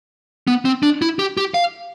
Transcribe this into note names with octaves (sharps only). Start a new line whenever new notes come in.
B3
C4
D4
E4
G4
G4
F5